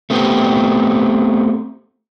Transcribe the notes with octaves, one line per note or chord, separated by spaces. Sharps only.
A3 B3 C4 G4